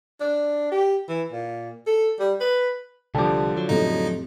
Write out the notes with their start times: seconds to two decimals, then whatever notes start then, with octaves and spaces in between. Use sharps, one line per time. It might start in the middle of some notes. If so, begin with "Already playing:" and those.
0.20 D4
0.71 G4
1.08 E3
1.32 A#2
1.87 A4
2.19 G3
2.40 B4
3.15 C2 D3 F3 G3 A5 D6
3.57 F#3
3.69 F2 A2 C3 D#4